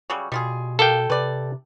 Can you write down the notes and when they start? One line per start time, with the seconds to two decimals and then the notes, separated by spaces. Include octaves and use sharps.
0.10 C#3 F#3 G3
0.32 B2 G3 F4 G#4
0.79 G4 A4 A#4 F5 G5
1.10 C3 B4 D5